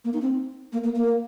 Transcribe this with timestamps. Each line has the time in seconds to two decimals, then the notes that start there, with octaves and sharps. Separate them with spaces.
0.05 A#3
0.14 D#4
0.22 C4
0.73 A#3
0.84 A#3
0.96 A#3